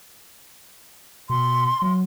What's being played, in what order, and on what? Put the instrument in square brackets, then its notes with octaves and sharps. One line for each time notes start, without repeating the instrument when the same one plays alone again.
[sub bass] B2 [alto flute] C6
[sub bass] F#3